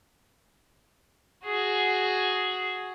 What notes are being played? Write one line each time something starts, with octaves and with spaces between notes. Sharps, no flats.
F#4 G#4